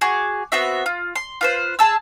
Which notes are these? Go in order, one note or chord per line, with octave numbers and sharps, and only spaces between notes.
F#4 G#4 D6
B3 C4 F#4 E5
F4
C6
F4 B4 C5
G#4 A5 E6